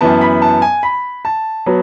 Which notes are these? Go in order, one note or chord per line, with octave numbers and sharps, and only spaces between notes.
F#2 E3 B3 A5
B5
A5
G#5
B5
A5
F#3 B3